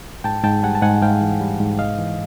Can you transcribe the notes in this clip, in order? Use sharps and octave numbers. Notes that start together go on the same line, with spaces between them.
G#2 G5 A5
G#2 G5 A5
G3 F#5 G#5
A5
G#2 F#5 G#5
G#2 F5 G5
E3
G3
G#2
C2 D#5 F5
E3